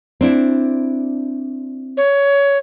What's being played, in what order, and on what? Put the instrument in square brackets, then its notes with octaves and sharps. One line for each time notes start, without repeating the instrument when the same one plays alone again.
[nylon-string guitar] C4 D4 E4
[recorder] C#5